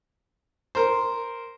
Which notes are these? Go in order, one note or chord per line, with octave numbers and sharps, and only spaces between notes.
A#4 C5